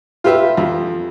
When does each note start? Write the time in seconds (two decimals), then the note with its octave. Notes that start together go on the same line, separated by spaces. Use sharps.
0.24 F4 G4 B4 E5
0.57 F2